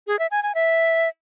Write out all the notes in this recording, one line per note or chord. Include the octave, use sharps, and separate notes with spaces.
G#4
E5
G#5
G#5
E5